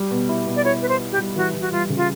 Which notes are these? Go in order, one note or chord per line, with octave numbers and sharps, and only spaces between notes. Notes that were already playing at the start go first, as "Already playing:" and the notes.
Already playing: G3
B2
E4
B2
D5
E4 C#5
B3 B4
C5
E4
G4
G3
E3 F#4
E3
F#4
G3 F4
C#3
F4